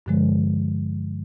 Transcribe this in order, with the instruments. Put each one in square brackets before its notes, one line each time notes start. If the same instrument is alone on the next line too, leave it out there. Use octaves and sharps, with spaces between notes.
[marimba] G2 D3 F3 G#3